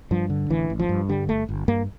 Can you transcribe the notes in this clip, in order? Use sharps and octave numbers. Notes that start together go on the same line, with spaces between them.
G2 F3
D3
A1 E3
A1
F3
G2
D3 G3
G1 A3
G1
G2 A#3